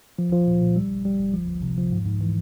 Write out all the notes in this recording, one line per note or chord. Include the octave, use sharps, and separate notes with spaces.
F3
F3
A#2
A#2
G3
G1
G3
G1
F3
C#2
C3
F3
G#2
G#2
E3